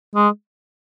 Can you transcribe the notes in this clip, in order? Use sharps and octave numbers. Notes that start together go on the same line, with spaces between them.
G#3